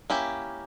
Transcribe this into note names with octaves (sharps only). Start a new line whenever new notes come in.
A#3 C#4 E4 G4